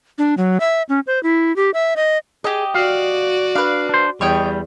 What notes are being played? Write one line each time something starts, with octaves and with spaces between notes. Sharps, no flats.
D4
F#3
E5
C#4
C5
E4
G4
E5
D#5
G4 G#4 D#5
F#4 D5 F5
D4 B4 F5
D4 C5
E2 G3 C#5 D#5 G5